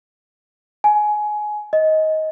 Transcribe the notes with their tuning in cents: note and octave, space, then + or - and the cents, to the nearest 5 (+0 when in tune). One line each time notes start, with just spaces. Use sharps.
G#5 +20
D#5 +15